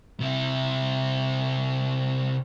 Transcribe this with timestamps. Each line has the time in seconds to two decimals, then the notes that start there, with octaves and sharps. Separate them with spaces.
0.20 C3 E4